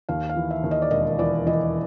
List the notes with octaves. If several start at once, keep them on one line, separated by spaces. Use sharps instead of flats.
D#2 F5
F5
E3
E5
D#2
D#5
D5
E1 D#5
E3 D5
E3 D#5